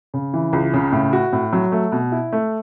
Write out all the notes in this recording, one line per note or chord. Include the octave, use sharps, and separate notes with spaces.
C#3
E3
C#2
C#3
A2
F#4
A2
F#3
A3
B2
E4
A3